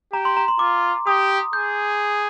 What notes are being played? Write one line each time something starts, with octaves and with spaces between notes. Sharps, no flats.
G4 A#5
C6
A#5
C6
F4 D6
G4 D#6
G#4 G6